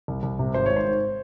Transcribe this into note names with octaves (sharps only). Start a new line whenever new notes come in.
C2
C2
C3
G#1 C5
G#2 C#5
C5
G#2